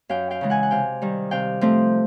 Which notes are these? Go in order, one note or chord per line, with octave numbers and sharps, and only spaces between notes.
F#2 F5 G5
F5 G5
C#3 E3 G#3
F#5 G#5
F#5
C3 F5 G5
D#3 G3
C3 F5 G5
F3 A3 C4